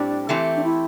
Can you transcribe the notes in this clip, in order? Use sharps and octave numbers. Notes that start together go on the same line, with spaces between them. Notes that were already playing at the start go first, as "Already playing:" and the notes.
Already playing: A2 G3 C4 D4 G4
E3 A3 C4 G4
D4
E4